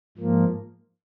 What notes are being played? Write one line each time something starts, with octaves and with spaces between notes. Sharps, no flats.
G#2 F3 A#3